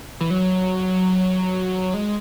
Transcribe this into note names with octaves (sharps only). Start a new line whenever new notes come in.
E3
F#3
G#3